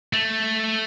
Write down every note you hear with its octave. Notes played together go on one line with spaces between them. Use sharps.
A3